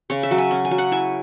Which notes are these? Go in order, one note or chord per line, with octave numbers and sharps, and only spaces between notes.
C#3 C#5
E5
F#3
G#5
C#4
G#5
F#3
F#5
E4 G#5